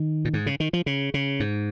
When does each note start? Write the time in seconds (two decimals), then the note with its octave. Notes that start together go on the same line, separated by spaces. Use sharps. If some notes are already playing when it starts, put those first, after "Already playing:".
Already playing: D#3
0.25 A#2
0.34 G#2
0.46 C#3
0.60 D#3
0.73 F3
0.86 C#3
1.14 C#3
1.40 G#2